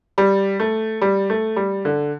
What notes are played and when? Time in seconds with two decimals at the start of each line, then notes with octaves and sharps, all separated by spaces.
0.18 G3
0.60 A3
1.01 G3
1.30 A3
1.56 G3
1.85 D3